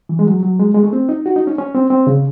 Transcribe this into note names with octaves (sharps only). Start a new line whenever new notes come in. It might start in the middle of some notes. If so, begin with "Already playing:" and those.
E3
G#3
F#3
F#3
G#3
G#3
A3
C4
D#4
F#4
D#4
C#4
C#4
C4
C4
C#3